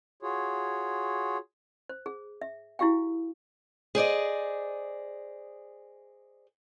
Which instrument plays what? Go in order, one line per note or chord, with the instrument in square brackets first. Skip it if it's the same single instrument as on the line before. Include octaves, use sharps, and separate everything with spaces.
[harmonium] F4 F#4 G#4 C#5
[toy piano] C5
G#4
E5
E4 F#4 G4 F5 G5
[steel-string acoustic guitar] G#4 C5 D5 D#5